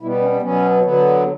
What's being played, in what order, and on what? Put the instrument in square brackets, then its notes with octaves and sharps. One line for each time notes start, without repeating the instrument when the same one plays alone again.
[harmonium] B2 G3 B3 E4
C#4
B2 F#3 B3 C#4
D3 F#3 B3